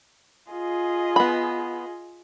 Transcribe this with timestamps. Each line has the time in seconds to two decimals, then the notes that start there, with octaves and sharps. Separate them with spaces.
0.50 F4 G#4 D#5
1.16 B3 B5